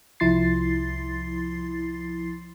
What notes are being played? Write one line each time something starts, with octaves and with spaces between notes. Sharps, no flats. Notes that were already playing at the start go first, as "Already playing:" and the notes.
C2 F3 E4 C6 A6 C7